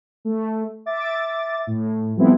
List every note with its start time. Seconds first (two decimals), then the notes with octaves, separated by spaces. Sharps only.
0.25 A3
0.86 E5 D6 A6
1.67 A2
2.16 F3 G3 A3 B3 C4 E4